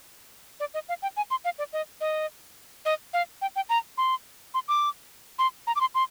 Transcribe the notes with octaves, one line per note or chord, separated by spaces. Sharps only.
D5
D#5
F5
G5
G#5
C6
F5
D5
D#5
D#5
D#5
F5
G5
G5
A#5
C6
C6
D6
C6
A#5
D6
C6
C6